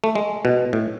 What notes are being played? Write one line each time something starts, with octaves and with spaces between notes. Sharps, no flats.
A3
G#3
B2
A2